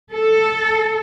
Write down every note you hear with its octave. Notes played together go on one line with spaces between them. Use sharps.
A4